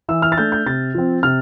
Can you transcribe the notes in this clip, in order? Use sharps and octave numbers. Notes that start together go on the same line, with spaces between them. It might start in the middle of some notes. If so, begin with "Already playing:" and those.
E3 E6
F6
A6
A3 D4 G6
G6
C3 A6
F3 C4
C3 F6